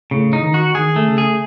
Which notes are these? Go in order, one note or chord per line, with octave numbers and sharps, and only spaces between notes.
A2 C#3
D#4
D#3
F#4
D#3 G#4
A3
C#3
G#4